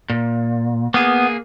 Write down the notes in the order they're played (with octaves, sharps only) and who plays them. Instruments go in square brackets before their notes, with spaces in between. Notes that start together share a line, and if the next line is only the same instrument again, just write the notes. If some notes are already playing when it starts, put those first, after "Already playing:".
[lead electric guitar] A#2
[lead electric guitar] A#3 G#4 [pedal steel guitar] B3